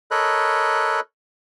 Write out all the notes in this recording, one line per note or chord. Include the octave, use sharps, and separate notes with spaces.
A4 A#4 C#5 D#5 B5 F#6